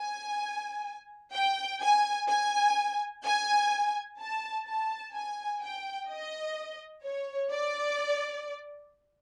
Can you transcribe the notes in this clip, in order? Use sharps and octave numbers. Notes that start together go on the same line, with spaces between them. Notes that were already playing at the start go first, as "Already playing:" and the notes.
Already playing: G#5
G5
G#5
G#5
G#5
A5
A5
G#5
G5
D#5
C#5
D5